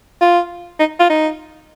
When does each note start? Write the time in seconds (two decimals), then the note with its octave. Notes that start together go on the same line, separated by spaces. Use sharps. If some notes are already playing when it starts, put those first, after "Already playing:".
0.21 F4
0.79 D#4
1.00 F4
1.09 D#4